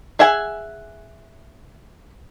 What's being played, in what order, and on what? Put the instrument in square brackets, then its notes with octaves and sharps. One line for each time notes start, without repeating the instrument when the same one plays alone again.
[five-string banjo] G#4 E5 F#5 G#5